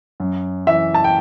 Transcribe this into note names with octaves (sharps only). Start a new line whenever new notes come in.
F#2
E3 E5
A5
G5